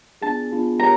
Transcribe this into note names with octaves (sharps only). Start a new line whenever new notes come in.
B3 D4 F4 G#4 A5
B3 D4 F4 G#4
G4 A#4 C#5 A#5